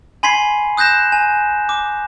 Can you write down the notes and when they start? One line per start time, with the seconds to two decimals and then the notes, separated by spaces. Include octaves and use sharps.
0.23 G#5 B5 C6 G#6 B6 C7
0.77 D#6 F#6 G6 A#6 E7
1.12 G#5
1.69 D6